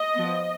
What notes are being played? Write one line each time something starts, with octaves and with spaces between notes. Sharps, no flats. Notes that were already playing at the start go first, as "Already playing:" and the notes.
Already playing: D#5
F3 B3